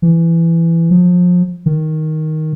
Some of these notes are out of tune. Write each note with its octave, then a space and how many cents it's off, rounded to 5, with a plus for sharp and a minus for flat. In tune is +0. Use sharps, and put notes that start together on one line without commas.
E3 +15
F3 +30
D#3 +5